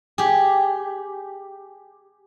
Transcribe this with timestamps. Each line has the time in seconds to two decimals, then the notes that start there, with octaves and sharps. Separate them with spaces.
0.18 G4 G#4